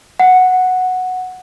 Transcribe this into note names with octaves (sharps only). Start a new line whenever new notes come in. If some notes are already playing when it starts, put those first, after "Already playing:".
F#5